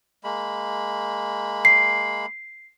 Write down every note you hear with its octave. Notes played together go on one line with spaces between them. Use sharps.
G#3 A#3 B5
C7